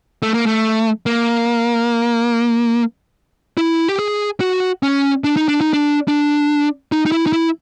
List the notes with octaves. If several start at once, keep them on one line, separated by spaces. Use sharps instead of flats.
A3
A#3
A3
A#3
E4
G4
G#4
F#4
C#4
D4
D#4
D4
D#4
D4
D4
D#4
D#4
E4
D#4
E4